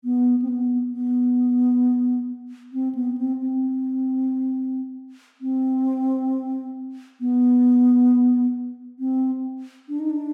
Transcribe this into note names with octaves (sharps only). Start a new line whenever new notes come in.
B3
C4
B3
B3
C4
B3
C4
C4
C4
B3
C4
D4
D#4
D4